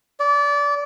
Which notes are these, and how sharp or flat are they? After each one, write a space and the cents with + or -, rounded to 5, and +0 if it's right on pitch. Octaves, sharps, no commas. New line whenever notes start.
D5 -25